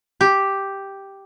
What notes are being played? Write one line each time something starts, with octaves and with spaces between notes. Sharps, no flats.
G4